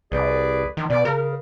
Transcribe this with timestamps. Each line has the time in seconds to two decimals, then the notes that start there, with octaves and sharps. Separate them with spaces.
0.12 C2 G#4 B4 D5
0.77 D#3
0.90 B2 D5
1.05 C#3 A#4